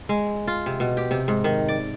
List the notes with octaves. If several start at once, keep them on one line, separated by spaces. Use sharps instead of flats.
G#3
F4
C3
B2
G4
C3
G#2
D#3
D5